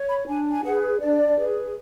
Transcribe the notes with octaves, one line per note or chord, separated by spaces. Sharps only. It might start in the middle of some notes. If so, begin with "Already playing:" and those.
Already playing: C#5
B5
D4 G#5
G#5
G#4 B4 F#5
D4 D5
G#4 B4